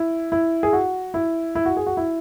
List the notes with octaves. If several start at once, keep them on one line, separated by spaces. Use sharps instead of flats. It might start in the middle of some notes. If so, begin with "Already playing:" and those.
Already playing: E4
E4
G#4
F#4
E4
E4
F#4
G#4
F#4
E4